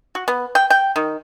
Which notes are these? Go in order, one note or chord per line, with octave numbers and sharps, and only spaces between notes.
F#4
B3
G5
G5
D#3